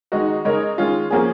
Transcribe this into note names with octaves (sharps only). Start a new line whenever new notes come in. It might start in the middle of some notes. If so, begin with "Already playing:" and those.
D#3 G#3 D#4 F#4
C#3 G#3 D#4 A#4 C#5
D#3 G#3 C#4 F4
F3 A#3 C#4 G#4